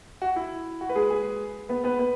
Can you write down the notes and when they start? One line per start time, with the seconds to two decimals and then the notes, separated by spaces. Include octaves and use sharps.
0.22 F#4
0.36 E4
0.81 F#4
0.89 B4
0.96 G#3 G#4
1.10 G#3 G#4
1.69 B3 B4
1.84 B3 B4
1.99 B3 B4